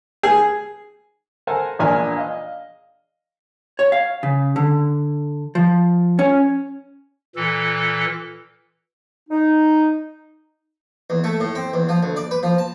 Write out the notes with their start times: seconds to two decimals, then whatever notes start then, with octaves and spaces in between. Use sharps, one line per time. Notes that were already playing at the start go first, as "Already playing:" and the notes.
0.23 G#4
1.47 A4 A#4 C5 F#5 G#5 A5
1.79 A#1 E2 A#2 D4 G#5 F6
2.17 D#5 F5
3.79 C#5
3.92 F5
4.23 C#3
4.56 D3
5.55 F3
6.19 C#4
7.36 A#2 E3 A4
9.30 D#4
11.10 E2
11.24 A3
11.40 A2
11.55 C4
11.74 E2
11.89 F3
12.03 D2
12.17 D5
12.31 B4
12.43 F3
12.58 A5